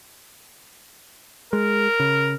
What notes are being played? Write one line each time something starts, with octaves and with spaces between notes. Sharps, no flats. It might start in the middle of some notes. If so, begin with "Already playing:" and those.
G#3 A#4
C#3